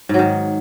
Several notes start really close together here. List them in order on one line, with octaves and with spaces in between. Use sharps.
G#2 F#3 D#3